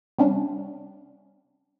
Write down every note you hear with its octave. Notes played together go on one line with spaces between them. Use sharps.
C3 G3 C#4 D4